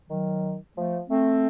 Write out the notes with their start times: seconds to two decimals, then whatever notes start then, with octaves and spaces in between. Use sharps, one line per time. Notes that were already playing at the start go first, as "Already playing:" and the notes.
0.09 D#3 F#3
0.76 F3 A3
1.09 A3 C4